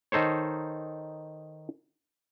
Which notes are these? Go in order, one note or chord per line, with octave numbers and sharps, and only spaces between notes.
D#3 D#4 A4 C5 C#5